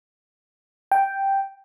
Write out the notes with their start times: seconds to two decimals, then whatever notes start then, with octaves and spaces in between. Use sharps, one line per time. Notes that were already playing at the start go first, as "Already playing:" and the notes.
0.92 G5